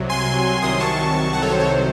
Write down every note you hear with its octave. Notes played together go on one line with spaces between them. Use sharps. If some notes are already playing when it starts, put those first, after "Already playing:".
Already playing: C2 C3 F#3
G#5 C6
C2 C3 D#3 F#3 C6 D#6
A5 C#6
F#5 A5
A4 C#5
C5
A4 C#5
C5